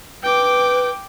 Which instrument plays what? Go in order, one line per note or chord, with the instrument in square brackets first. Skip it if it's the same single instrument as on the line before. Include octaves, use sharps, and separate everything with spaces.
[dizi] B4 [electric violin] G5 D6